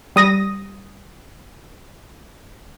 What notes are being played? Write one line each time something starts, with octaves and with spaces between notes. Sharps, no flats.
G3 D#6 A#6